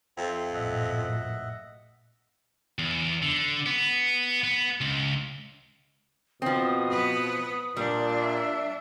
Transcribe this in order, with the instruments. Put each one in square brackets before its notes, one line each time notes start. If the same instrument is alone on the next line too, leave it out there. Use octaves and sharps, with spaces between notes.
[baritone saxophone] F2 [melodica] E5 G5 C6
[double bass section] A1 F#2 A#2 [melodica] D#5 E5 F#5
[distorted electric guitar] E2
D3
B3
B3
C#2
[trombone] B2 [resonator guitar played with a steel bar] F3 C4 [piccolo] D#6
[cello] B3 B4
[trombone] A#2 [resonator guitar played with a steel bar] G3 [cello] D4
[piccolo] E5